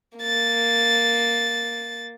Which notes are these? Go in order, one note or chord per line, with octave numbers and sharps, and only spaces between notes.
A#3 A6